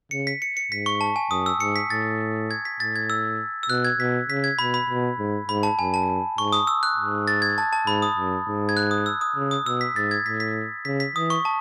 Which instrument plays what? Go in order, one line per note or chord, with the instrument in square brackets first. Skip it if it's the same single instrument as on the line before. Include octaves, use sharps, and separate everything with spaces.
[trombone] C#3 [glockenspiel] C#7
[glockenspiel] B6
C#7
C#7
[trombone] G#2 [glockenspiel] B6
[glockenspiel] C#6
A5
G#5
[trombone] F#2 [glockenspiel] D#6
[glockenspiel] E6
[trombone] G#2 [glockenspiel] C#7
[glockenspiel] B6
[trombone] A2 [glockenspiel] A6
[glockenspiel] G#6
B6
[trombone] A2 [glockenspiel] A6
[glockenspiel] G#6
E6
E6
[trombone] B2 [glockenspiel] F#6
[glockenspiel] G#6
[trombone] B2 [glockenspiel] B6
[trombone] C#3 [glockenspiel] B6
[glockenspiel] G#6
[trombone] B2 [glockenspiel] B5
[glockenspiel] B5
[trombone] B2
G#2
[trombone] G#2 [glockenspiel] B5
[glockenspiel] A5
[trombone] F#2 [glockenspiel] G#5
[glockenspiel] A5
[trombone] G#2 [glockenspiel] C#6
[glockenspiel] D#6
E6
F#6
[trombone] G#2
[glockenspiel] A6
G#6
A5
A5
[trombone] G#2 [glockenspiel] B5
[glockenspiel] D#6
[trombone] F#2
G#2
[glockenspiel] G#6
F#6
D#6
E6
D#6
[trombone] C#3
[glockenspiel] D#6
[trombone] B2 [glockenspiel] E6
[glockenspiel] B6
[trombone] G#2 [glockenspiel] A6
[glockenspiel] G#6
[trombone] A2 [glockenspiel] B6
[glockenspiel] B6
[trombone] C#3 [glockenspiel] B6
[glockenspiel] B6
[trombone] E3 [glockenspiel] D#6
[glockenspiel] C#6
A5